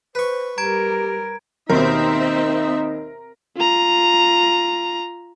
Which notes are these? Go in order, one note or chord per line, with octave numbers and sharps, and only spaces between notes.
B4 C5 C#6
G3 G4 A#4 A#5 G#6 D7
D#2 B2 C4 D#4 A#4 E5
F4 A#5